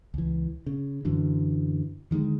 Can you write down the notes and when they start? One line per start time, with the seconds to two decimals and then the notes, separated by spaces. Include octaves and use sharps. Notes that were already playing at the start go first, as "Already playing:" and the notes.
0.14 C#2 E3
0.66 C#3
1.05 F#2 D3 E3 F#3
2.11 D3 D#3 G3 G#3